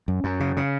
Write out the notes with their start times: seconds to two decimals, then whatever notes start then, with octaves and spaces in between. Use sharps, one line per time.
0.08 F#2
0.24 F#2
0.40 C#3
0.57 C#3